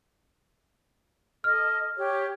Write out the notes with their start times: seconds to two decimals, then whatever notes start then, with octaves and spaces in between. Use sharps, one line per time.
1.44 A4 D#5 F6
1.96 G4 C#5